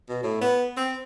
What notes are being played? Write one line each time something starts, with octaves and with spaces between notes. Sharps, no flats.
B2
A2
B3
C4